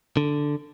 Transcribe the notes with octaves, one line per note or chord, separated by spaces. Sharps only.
D3